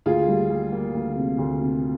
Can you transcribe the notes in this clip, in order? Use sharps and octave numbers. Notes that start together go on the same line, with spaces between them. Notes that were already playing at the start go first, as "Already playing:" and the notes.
D2 F4 G#4
G3
G3
A#3
D2
C3
D2
C3